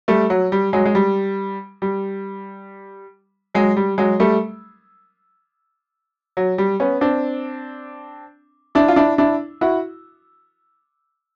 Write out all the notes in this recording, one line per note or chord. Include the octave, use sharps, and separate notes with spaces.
G3 A3
F#3
G3
F#3 G#3
G#3
G3
G3
F#3 G#3
G3
F#3 G#3
G3 A3
F#3
G3
B3 C#4
C4 D4
D4 E4
F4
D4 E4
D4 E4
E4 F#4